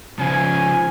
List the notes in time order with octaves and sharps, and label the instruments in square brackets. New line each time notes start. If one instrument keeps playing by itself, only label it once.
[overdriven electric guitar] C#3 F3 [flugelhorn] G#5